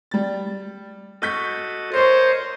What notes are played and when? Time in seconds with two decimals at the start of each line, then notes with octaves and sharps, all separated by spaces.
0.11 G3 A6
1.22 F#4 A4 D#5 C#6 G6 B6
1.94 A#4 C5 C#5 D#5 C#6 C7